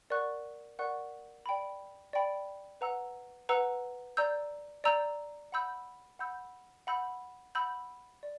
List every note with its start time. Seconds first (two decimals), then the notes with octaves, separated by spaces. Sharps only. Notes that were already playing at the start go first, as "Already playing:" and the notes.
0.10 A#4 D5 F#5 C#6 F#6
0.79 A#4 D5 F#5 C#6 F#6
1.46 D5 G5 B5
2.13 D5 G5 B5
2.81 B4 F#5 A#5 E6
3.49 B4 F#5 A#5 E6
4.17 D5 A#5 E6 G6
4.84 D5 A#5 E6 G6
5.52 F#5 B5 E6 G6
6.19 F#5 B5 E6 G6
6.87 F#5 B5 E6 G6
7.55 F#5 B5 E6 G6
8.23 D5